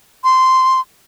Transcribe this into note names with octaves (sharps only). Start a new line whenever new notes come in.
C6